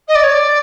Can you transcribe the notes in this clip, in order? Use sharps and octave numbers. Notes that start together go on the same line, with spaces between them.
D#5
D5
C#5
D5